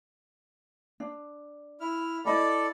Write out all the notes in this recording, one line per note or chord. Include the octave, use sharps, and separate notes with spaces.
D4
E4 F6
E4 A4 D5 D#5 B5